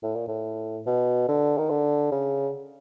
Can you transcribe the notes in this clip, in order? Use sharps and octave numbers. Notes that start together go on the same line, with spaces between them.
A2
A#2
A2
B2
D3
D#3
D3
C#3